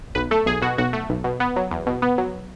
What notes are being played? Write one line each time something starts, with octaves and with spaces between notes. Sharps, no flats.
B1 B4
A3 A4
B1 G#4
B2 F#4
B1 F#4
A3
B1
B2
B3
F#3
E2
B2
B3
F#3